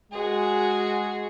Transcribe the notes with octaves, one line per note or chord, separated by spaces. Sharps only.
G#3 F#4 G#4